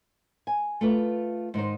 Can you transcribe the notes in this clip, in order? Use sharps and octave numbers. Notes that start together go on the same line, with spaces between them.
G#5
A3 F4 B4
G#2 D#3 D#4 C5